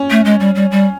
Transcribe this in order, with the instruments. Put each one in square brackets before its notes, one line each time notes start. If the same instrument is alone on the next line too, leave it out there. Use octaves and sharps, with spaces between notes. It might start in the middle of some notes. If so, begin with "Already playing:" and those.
Already playing: [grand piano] C#4
[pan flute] A3
G#3
G3
G3
G3